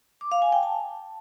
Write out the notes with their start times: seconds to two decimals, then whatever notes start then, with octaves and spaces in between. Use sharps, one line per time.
0.21 D6
0.32 F5
0.42 G#5
0.52 G5
0.63 A5